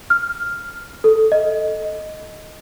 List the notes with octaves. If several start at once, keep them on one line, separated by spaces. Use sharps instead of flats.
F6
A4
D#5